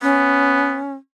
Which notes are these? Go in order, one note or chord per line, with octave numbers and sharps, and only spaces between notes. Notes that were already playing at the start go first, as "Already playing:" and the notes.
B3 C#4